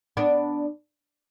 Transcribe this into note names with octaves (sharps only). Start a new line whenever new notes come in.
B3 D4